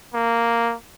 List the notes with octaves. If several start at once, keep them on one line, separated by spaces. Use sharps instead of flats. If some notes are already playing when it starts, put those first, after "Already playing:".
A#3